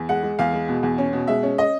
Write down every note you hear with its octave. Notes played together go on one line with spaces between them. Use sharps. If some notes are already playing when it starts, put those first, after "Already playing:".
Already playing: E2
G#3 F#5
G#3
E2 F5
G#3
B2
E2
C#4
B2
G#3 E5
C#4
D#5